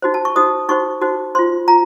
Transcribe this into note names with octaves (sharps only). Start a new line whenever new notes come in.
D#4 F#4 C5
A5
C#6
D#4 F#4 C5 D#6
D#4 F#4 C5 C#6
D#4 F#4 C5
F4 C5 C6
F4 A#5